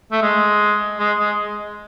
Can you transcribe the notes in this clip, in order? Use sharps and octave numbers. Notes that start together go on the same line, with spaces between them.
A3
G#3
G#3
G#3